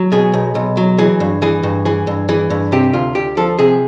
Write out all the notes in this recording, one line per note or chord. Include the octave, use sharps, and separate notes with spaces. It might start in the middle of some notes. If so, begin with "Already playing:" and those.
Already playing: F#3
B2 G#4
B1
B1
F#3
E3 G#4
G2
E3 G#4
G2
E3 G#4
G2
E3 G#4
G2
C3 G4
D2 F4
D2 G4
F3 A4
C3 G#4